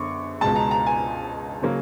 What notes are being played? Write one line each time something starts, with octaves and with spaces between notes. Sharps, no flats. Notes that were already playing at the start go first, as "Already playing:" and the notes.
Already playing: F#2 D3 B3 C#6 D6
C#2 B2 G#3 A5
A#5
A#5
G#5
C#3 F#3 A#3